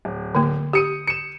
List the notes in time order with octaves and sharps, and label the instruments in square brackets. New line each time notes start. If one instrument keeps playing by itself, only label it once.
[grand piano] D1
[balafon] D3 A#3
[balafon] G4 [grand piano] D#6 C#7 D#7
[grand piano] C#7 E7